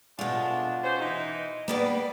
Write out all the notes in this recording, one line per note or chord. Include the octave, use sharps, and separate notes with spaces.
B2 G#3 A3 D4 F4
C#4 G4 C5
E3 D#4
G3 G#3 A#3 B3 B4 D5